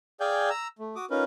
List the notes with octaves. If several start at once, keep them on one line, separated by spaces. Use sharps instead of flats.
G#4 D5 F5 G5 G#5 G6
A#5 E6
A3
F#4 D6 D#6
C#4 D#4 F4 A#4 B4